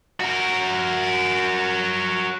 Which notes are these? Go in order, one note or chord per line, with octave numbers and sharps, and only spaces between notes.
F#4 A#4